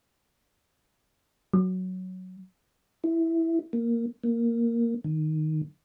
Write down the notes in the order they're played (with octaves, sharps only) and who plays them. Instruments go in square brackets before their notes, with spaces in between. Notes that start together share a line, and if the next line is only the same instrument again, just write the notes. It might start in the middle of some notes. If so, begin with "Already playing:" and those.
[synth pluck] F#3
[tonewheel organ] E4
A#3
A#3
D#3